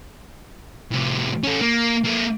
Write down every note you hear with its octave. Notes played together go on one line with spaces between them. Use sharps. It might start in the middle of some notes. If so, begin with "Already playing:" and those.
A2 C3
C#4 A4
A#3
A#3 A4